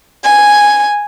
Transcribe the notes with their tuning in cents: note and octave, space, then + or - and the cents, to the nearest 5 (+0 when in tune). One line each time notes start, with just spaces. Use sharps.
G#5 -5